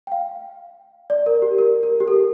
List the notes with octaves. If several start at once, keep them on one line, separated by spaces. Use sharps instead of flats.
G5
F5
D5
A#4
G4
A#4
A#4
G4
A4